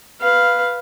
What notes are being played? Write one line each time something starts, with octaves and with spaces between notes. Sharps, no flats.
B4 F5